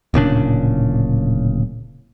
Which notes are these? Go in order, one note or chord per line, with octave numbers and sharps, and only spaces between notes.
D1 A#2 C#3 D4